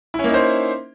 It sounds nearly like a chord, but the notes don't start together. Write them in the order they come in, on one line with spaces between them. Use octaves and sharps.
E4 C#4 A#3 D#4 C5